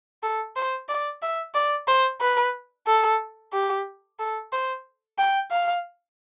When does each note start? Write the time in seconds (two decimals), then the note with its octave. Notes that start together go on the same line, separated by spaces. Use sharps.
0.23 A4
0.56 C5
0.89 D5
1.22 E5
1.55 D5
1.88 C5
2.21 B4
2.87 A4
3.53 G4
4.20 A4
4.53 C5
5.19 G5
5.51 F5